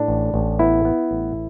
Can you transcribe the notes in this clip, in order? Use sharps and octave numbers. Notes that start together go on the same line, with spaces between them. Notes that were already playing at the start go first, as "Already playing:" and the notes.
Already playing: A2 D4
A1
A1
B3 E4
B3
A1